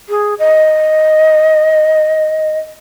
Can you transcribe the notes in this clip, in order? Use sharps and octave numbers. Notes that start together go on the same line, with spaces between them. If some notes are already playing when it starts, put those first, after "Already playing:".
G#4
D#5